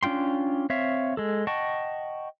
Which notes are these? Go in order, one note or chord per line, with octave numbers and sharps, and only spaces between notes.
C#4 D4 F4 G5 C6
C4 C#5 E5 F5
G#3 A4
D#5 F#5 G5 A5 C#6